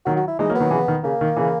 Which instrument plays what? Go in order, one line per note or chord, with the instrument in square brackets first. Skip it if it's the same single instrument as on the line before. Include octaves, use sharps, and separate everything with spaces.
[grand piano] D#3 F#3 [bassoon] F#4
[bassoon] F#4
E4
[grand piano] E3 G#3 [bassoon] D#4
[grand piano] F#3 A#3
[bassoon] B3
[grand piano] D#3 F#3
C#3 E3
D#3
[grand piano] C#3 [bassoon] A#3
[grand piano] D#3
C#3 E3